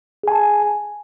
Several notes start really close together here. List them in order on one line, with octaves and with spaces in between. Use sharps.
G#4 G#5 A5